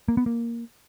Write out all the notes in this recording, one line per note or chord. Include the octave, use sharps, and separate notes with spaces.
A#3
B3
A#3